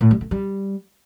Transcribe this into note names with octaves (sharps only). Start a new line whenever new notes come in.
A2
G3
A3
G3